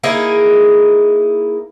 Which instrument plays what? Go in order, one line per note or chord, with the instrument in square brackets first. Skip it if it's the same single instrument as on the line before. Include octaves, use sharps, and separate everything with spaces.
[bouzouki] A#3 D#4 E4 G#4